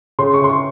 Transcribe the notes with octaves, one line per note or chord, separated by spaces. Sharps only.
C#3 C6
C#6
C#3 C6
C#6